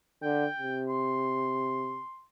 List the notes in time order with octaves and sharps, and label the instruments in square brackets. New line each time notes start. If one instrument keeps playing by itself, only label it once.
[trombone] D3 [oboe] G5
[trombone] C3
[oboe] C6